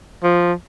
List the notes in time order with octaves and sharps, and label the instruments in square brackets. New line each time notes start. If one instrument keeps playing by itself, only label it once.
[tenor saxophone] F3